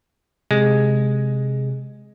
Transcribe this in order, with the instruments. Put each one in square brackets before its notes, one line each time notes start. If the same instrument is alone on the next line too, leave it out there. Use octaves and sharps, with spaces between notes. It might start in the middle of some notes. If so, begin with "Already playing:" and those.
[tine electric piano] C3 [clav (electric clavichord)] G#3